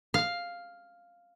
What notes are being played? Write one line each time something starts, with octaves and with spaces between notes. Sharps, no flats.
F5